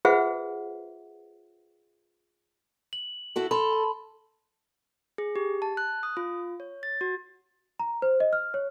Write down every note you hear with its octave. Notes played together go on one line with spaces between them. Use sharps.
F4 G#4 B4 C5 E5 F#5
F#7
E4 F#4 A4
A4 B5 C6
A5
G#4
G4
A5
F#6
D#6
F4
C#5
A6
F#4
A#5
C5
D#5
F6
C#5